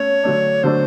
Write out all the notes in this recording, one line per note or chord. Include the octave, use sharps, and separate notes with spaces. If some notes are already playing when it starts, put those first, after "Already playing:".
Already playing: A3 C#4 C#5
D3 F#3 A3 D4
D3 F#3 A3 D4 C5